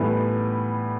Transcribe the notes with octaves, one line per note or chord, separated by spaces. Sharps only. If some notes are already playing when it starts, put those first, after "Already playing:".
Already playing: A2 E3 G3 B3